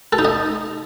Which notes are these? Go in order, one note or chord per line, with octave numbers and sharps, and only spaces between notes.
A4
D#4
D#5